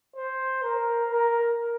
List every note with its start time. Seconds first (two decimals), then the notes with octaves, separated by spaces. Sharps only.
0.16 C5
0.63 A#4
1.11 A#4